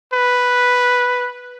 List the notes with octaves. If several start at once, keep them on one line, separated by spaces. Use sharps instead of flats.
B4